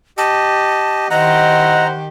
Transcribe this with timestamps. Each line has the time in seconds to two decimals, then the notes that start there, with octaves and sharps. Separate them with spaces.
0.18 G4 D#5 A5
1.11 D#3 E4 G4 C5 D#5 F#5 A#5